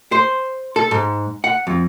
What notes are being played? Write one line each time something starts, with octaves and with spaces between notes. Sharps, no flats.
C5
A4
G#2
F#5
F2